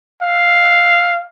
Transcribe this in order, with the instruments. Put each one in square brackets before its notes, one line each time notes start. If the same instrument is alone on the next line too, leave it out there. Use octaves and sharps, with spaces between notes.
[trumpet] F5